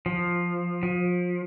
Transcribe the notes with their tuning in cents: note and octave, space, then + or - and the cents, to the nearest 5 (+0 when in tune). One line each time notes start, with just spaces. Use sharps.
F3 +5
F3 +30